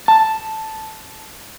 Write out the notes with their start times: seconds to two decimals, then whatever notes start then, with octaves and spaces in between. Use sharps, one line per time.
0.08 A5